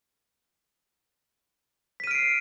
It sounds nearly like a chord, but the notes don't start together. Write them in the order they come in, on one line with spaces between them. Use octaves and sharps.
B6 D#7 F6 D7 C7